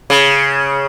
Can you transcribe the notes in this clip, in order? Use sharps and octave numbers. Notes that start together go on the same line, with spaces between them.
C#3